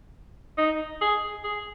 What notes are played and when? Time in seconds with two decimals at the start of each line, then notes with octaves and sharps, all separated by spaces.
0.58 D#4
1.01 G#4
1.44 G#4